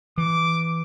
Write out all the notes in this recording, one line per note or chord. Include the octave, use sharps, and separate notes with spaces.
E3 D6